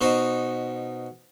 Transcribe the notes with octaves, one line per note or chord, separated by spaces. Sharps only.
B2 D#4 C5